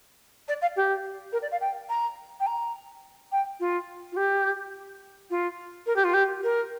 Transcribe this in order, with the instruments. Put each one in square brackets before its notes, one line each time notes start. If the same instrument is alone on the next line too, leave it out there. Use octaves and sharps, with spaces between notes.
[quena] D5
F5
G4
A#4
D5
F5
G5
A#5
G5
A#5
G5
F4
F4
G4
F4
A#4
G4
F4
G4
A#4